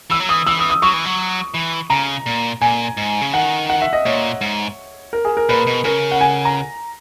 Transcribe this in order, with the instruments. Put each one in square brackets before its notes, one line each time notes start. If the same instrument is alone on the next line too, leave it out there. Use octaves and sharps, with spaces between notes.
[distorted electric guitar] E3 [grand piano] E6
[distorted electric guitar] F#3
[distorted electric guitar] E3 [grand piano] D#6
[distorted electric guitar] E3 [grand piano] E6
[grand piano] D#6
D#6
[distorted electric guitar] F#3 [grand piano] C#6
[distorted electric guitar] E3
F#3
E3
[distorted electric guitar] C#3 [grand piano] A#5
[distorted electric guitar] A#2
[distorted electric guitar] A#2 [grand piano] G#5
[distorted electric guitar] G#2
C#3
[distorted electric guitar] D#3 [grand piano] F#5
[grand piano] F#5
E5
D#5
[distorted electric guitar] A#2 [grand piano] C#5
[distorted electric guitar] G#2
[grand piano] A#4
G#4
A#4
[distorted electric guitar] A#2 [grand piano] B4
[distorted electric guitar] B2
[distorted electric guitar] C#3 [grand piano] A#4
[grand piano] F#5
G#5
A#5